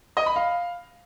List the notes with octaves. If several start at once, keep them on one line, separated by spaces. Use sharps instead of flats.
D#5
B5
F5